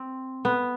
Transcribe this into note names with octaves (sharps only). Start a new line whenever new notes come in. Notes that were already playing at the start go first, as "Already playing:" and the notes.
Already playing: C4
B3